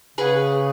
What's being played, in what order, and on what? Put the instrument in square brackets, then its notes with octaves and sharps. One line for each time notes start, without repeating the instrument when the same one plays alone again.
[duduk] C#3 [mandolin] G#4 B4 F#5